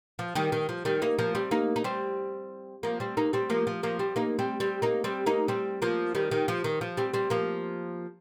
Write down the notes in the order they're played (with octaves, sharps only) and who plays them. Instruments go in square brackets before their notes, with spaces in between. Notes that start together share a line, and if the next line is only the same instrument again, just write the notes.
[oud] F3
D#3 G3
D#3
F3
D#3 G3
A#3 D#4
F3 A#3
G3 C4
A#3 D#4
D#4
G3 C4
F3 A#3
G3 C4
A#3 D#4
G3 C4
F3 A#3
F3
F3 A#3
G3 C4
A#3 D#4
G3 C4
G3 C4
A#3 D#4
G3 C4
A#3 D#4
G3 C4
F3 A#3
D#3 G3
D#3
F3
D#3
F3
G3 C4
G3 C4
F3 A#3